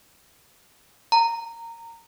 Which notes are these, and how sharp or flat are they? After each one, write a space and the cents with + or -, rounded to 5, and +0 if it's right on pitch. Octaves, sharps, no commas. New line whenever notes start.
A#5 -20